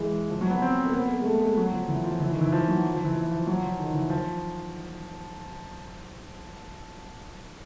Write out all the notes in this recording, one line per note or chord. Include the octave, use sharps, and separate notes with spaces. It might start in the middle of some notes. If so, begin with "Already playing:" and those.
Already playing: E3 G#3
F3
F#3
B3
C4
A#3
B3
A#3
G#3
A3
G#3
F#3
F3
E3
F3
E3
D#3
E3
F3
F#3
F3
E3
E3
F3
F#3
F3
D#3
E3
F3